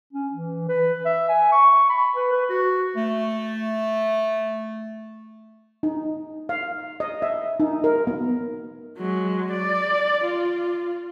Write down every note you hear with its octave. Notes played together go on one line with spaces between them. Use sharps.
C#4
E3
B4
E5
G#5
C#6
B5
B4
B4
F#4
A3
D#4
F5
D#5
E5
D#4
A#4
B3
F#3 G#3
D5
F4